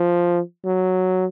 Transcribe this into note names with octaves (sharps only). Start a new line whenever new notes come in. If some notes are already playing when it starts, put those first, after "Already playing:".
Already playing: F3
F#3